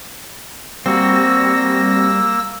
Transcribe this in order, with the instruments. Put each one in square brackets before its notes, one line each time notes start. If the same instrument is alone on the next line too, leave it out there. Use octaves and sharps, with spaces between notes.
[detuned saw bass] G3 [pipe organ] A#3 E6 A#6 [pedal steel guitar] C4 F#4